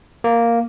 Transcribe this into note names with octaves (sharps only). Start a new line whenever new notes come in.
A#3